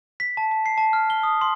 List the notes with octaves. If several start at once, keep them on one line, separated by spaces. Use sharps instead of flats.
B6
A5
A5
C7
A5
F6
G7
D#6
C6